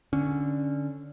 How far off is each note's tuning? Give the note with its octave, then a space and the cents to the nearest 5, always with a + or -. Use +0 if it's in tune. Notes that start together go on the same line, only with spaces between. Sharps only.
D3 +0 C#4 +0